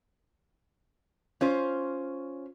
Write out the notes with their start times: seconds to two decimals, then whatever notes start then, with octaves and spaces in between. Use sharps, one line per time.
1.41 C#4 F4 C5